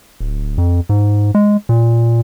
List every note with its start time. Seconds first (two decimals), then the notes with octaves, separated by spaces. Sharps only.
0.20 D1
0.58 F2
0.89 G#2
1.35 G#3
1.69 A#2